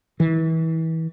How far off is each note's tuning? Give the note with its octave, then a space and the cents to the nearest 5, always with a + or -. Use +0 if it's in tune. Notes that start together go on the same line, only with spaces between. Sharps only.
E3 -30